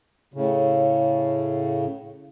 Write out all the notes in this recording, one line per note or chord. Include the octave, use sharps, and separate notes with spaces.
A2 C#3